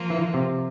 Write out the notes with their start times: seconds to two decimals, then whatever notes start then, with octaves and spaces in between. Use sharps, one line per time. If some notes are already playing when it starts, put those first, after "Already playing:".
Already playing: F3 A#3 F4
0.10 E3
0.34 C3